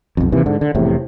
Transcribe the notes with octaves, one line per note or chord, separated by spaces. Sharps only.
B1 F2
D#2 C3 E3
G#2 D3
D3
F1 E2 A2 C3